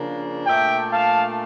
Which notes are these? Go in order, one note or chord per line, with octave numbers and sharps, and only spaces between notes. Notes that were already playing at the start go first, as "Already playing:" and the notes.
Already playing: C#3 F3 A#3 D4
A#2 A3 D4 E5 G5
F5 A5